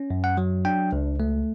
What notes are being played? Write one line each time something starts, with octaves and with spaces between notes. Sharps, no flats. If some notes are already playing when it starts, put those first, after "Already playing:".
Already playing: C#4
F#2
F#5
F#3
D4 G5
C#2
A3